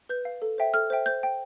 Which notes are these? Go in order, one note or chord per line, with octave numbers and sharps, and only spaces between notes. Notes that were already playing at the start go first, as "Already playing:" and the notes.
B4 G6
F5
A4
C5 E5 G5
A4 F6
C5 E5 G5
C5 G6
G5